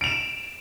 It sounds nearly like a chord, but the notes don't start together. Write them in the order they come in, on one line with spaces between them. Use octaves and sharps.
D7 F7 E7